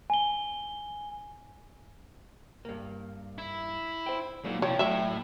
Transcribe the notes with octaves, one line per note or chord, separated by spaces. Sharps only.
G#5 G7
G2 A#3
E4
C5 G5
A#2 F#3 G#3 D#4
C3 F3 E4 C#5 G5
A2 F#3 D5 E5